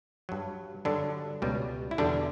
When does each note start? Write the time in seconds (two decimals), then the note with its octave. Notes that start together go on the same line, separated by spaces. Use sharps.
0.29 G2 F#3
0.85 G2 D3 F#3 D4
1.42 C#2 B2 G3
1.91 E4
1.98 E2 B2 D3 G3 D4